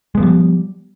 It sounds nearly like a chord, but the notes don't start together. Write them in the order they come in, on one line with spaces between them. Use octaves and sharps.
G#3 B3 F3 G3